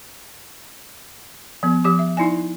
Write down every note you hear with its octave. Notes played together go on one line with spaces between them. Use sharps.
F3 B3
F3 G4 D6
E5
D#4 E4 D5 G#5